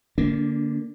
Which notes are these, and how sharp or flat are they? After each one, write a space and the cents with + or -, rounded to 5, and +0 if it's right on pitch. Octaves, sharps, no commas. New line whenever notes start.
D3 +0 A#3 +0 D4 -35